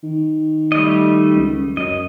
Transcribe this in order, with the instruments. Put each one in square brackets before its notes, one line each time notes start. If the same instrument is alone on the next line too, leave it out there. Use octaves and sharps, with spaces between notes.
[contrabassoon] D#3
[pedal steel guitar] G3 A3 D#5
[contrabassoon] C#2
[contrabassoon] F#2 [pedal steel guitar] D#5